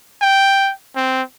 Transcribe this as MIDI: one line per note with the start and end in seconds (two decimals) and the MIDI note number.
0.22 0.72 79
0.96 1.22 60